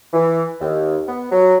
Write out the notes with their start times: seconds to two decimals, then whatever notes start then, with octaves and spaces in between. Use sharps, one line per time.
0.13 E3
0.61 D#2
1.08 B3
1.32 F#3